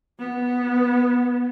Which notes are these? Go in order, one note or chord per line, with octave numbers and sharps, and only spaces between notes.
B3